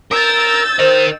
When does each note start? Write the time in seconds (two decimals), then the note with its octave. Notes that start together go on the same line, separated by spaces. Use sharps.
0.11 A#4 E6 G6 A6
0.79 A#4 C5 D#5